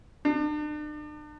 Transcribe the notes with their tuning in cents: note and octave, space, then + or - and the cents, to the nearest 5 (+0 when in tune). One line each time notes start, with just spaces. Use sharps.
D4 +40